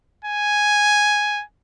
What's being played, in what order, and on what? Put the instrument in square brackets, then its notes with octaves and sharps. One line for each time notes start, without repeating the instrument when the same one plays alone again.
[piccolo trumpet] G#5